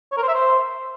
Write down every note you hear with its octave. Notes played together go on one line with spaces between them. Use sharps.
C#5
A#4
C5
E5
C5